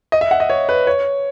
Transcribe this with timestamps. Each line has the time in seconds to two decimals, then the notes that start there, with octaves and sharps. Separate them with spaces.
0.12 D#5
0.21 E5
0.31 F#5
0.40 D#5
0.50 C#5
0.69 B4
0.87 C#5